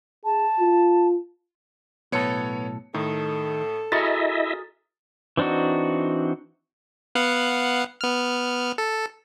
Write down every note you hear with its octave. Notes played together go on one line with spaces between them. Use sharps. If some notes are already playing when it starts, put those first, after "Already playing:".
G#4 A5
F4
B1 A2 B3 A4 C#5 C#7
A2 D#3 A4
E4 F#4 G#4 A#4 D#5 E5 A6
E3 C4 D4 D#4 F#4
B3 F5 F#5
B3 F6
A4